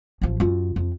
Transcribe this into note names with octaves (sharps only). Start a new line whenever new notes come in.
A1 F3
F#2 F4
F2